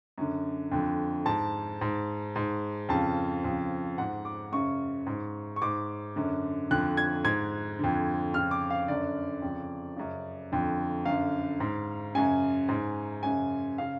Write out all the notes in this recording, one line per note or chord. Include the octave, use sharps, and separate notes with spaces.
F#2 D3
F2 D3
G#2 A5
G#2
G#2
F2 C#3 A5
F2 C#3
G#2 F#5
D6
F#2 C#3 C#6
G#2
C#6
G#2 D6
F#2 D3
F2 D3 F#6
G#6
G#2 G#6
F2 D3
F2 C#3 F6
D6
F5
F#2 D3 D5
F2 C#3
F#2 C#3
F2 D3
F#2 D3 F5
G#2
F#2 C#3 G#5
G#2
F#2 C#3 G#5
C#3 F5